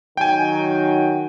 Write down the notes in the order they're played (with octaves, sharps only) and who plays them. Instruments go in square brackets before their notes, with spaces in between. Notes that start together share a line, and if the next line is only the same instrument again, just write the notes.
[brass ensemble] D#3 F#3 [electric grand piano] G5 G#5